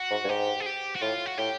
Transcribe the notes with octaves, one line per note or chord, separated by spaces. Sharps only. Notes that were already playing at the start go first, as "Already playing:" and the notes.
Already playing: F#4
G#2
G2
G#2 G4
G#4
G4
F#4
A2 F4
F#4
A2 G4